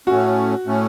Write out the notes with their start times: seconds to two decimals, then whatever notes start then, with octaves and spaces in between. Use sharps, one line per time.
0.07 A2 A3 C#4 F#4
0.66 A2 A3 C#4